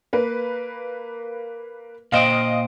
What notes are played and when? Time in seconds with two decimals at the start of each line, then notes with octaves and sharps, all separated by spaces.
0.13 A#3 B4
2.12 A#2 C5 D#5 F5 G5